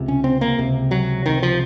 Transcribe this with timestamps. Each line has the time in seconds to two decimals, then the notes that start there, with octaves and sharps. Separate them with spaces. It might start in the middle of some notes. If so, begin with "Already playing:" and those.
Already playing: C#2 C3
0.08 C#4
0.24 C4
0.41 A#3
0.58 C#2 C3
0.91 F#3
1.26 C#2 C3 D#3
1.43 F3